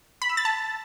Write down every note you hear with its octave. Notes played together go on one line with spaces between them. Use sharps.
B5
E6
A6
A5